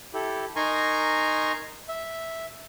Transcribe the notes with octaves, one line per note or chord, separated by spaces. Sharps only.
E4 G4 A4
D#4 A#4 G#5 A#5 C6 C#6
E5